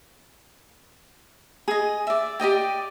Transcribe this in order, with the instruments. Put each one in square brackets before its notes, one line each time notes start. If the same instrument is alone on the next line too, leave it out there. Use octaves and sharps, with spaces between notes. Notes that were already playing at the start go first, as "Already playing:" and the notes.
[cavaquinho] G#4 D#5
D5 E5
G4 D5 D#5 G5